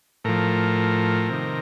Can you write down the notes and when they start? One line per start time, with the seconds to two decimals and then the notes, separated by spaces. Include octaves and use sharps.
0.24 A2 F3 A#4
1.30 C3 D#3